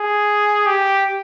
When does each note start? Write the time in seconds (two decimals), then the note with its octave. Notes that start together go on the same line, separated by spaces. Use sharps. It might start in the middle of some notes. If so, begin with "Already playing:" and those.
Already playing: G#4
0.67 G4